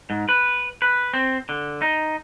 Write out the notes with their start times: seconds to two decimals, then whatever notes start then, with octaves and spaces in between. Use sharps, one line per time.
0.10 G#2
0.29 B4
0.82 B4
1.14 C4
1.49 D3
1.82 D#4